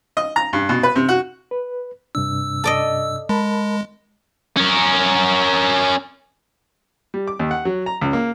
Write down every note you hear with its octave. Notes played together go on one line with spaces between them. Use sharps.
D#5
A#5
G2
B2
B4
C3
F#4
B4
G2 C3 D4 E6
A4 D5 D#5
G#3 A#4 A5 B5
C#4 A#4
G3
D6
D#2
F#5
F#3
A#5
C#2
A#3